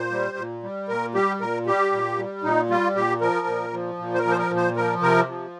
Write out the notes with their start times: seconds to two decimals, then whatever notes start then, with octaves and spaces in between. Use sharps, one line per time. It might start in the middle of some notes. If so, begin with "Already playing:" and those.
Already playing: A#2 C5
0.11 G3
0.37 A#2
0.63 G3
0.88 A#2 A#4
1.14 G3 G4
1.41 A#2 A#4
1.66 G3 G4
1.92 A#2
2.18 G3
2.43 A#2 D#4
2.69 G3 F4
2.96 A#2 G4
3.21 F3 A#4
3.47 A#2
3.73 F3
3.99 A#2
4.14 C5
4.19 A#4
4.25 F3
4.31 C5
4.38 A#4
4.51 A#2
4.56 C5
4.76 F3 A#4
5.02 C3 A#4
5.28 F3